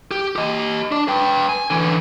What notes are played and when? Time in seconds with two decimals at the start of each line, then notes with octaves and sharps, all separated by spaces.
0.11 G4
0.36 G4 D#5
0.92 D4
1.08 B4 G5
1.49 G#5
1.70 D3 E3